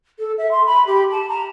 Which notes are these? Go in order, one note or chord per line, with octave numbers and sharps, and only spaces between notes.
A4
E5
C6
B5
G4
A5
A#5